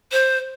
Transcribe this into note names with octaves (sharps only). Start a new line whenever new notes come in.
C5